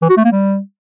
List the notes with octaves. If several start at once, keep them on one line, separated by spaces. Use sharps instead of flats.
E3
F#4
A3
A#3
G3